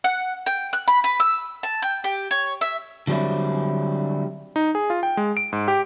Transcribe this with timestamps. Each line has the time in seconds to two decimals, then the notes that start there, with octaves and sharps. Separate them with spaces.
0.04 F#5
0.46 G5
0.73 F#6
0.88 B5
1.04 B4
1.20 E6
1.63 A5
1.82 G5
2.04 G4
2.31 C#5
2.61 E5
3.07 D3 F#3 G3 C4 E4
4.56 D#4
4.75 G#4
4.90 F4
5.03 G5
5.17 G#3
5.37 D7
5.53 G#2
5.68 G4